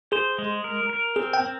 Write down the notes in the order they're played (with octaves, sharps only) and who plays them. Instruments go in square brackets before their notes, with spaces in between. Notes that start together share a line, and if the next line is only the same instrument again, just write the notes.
[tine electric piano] G#4 [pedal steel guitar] C5
[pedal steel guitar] G#3
A#4
A#4
[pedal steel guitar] C4 [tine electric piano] G#4
[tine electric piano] G5
[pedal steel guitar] C4